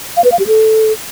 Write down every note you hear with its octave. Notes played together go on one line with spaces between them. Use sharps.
F5
B4
F5
G4
A4